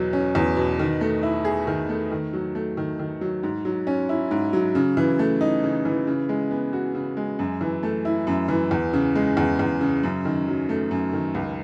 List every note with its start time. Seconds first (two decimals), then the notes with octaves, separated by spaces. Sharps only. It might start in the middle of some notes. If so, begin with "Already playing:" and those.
Already playing: E2 B2 F#3
0.13 C#4
0.35 E2
0.57 B2
0.79 D#3
1.01 A3
1.23 E4
1.45 G#4
1.67 D#3
1.89 A3
2.11 D#3
2.33 F#3
2.55 A3
2.77 D#3
2.99 D#3
3.21 F#3
3.43 G#2
3.65 F#3
3.87 C#4
4.09 E4
4.31 G#2
4.53 F#3
4.75 C#3
4.97 E3
5.19 A3
5.41 D#4
5.63 C#3
5.85 E3
6.07 C#3
6.29 G#3
6.51 B3
6.73 F#4
6.95 C#3
7.17 G#3
7.39 F#2
7.61 E3
7.83 A3
8.05 E4
8.27 F#2
8.48 E3
8.71 E2
8.93 C#3
9.15 G#3
9.37 E2
9.59 E2
9.81 C#3
10.03 F#2
10.25 D#3
10.47 F#3
10.69 A3
10.91 F#2
11.13 D#3
11.35 C#2